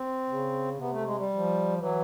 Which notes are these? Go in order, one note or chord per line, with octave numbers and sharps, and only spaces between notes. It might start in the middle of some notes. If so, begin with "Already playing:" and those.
Already playing: C4
C#3
C3 B3
A3
G#3
G3
F3
E3 F#3